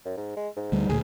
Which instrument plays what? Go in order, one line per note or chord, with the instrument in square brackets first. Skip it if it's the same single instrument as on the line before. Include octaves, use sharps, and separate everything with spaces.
[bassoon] F#2
G#2
G#3
G#2
[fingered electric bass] D2 G3
[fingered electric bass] D2 A#2 [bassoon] G#4